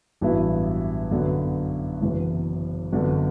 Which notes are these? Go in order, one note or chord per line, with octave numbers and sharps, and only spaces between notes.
A1 G2 F#3 B3 E4
F#2 D3 F#3 B3
F#1 F#2 E3 B3
G1 F#2 D3